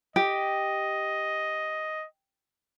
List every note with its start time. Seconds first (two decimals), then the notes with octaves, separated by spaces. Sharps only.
0.16 G4 D#5